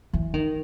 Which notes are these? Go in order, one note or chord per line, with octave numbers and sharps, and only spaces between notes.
E3
D#3